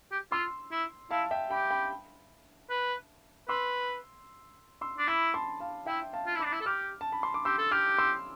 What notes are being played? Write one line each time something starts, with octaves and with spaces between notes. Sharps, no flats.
G4
F4 C6 E6
E4
E4 F5 A5
E5 G5
G4 G5 B5
G5 B5
B4
B4 C6 E6
C6 E6
D4
E4 B5 D6
A5 C6
F5 A5
E4 E5 G5
F5 A5
F4
E4
D4 B5 D6
E4
A4
G4 D6 F6
A5
B5
C6
D6
G4 C6 E6
A4
G4 D6 F6
C6 E6